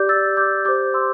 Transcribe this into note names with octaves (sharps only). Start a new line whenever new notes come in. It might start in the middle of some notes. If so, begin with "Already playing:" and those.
Already playing: G4 D5 D6 G6
E6 A6
D6 G6
G4 C5 D6 G6
C6 E6